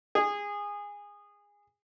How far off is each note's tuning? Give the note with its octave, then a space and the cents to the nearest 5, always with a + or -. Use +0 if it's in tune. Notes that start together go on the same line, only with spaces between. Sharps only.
G#4 -20